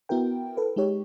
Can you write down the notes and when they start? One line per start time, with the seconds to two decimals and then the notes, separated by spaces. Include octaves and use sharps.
0.09 B3 E4 F#4 A#4 G5
0.57 A4 B4
0.76 G#3 D#4 G4 C#5